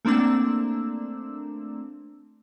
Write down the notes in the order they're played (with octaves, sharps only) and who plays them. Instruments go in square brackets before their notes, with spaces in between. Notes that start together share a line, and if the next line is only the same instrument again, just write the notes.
[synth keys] A3 A#3 C4 D4 E6